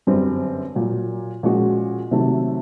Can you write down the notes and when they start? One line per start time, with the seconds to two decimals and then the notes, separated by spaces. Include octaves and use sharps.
0.07 G1 F#2 D3 G3 C4
0.75 A#2 F#3 A#3
1.43 A#2 F3 G#3 C#4 F#4
2.11 C3 D#3 F#3 A3